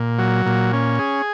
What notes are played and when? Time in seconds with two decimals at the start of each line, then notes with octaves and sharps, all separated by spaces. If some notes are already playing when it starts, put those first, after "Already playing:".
Already playing: A#2
0.19 F#3
0.46 A#2
0.73 C#4
0.99 G#4